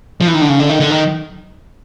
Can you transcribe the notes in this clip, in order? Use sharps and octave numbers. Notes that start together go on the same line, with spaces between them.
F3
E3
D#3
D3
C#3
D3
D#3
D3
D#3